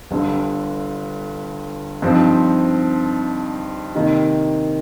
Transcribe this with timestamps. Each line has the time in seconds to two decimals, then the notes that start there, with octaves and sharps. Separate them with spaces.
0.11 G1 G2 D3
2.02 G2 F3 C4 D#4
3.95 C3 D#3 A#3